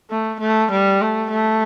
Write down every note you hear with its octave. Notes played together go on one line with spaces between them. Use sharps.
A3
A3
G3
A3
A3